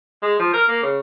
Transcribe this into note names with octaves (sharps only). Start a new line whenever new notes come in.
G#3
F3
A#4
A#3
C#3